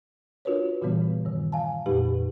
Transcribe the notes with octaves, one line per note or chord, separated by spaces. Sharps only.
D4 F4 F#4 A#4 B4 C#5
A#2 C#3 E3 G3 B3
G2 D#3
F5 G#5 A5
F2 A#2 G#3 D#4 G4 B4